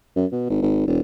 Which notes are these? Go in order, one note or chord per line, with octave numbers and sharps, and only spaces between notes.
F#2
B2
G#1
G#1
E1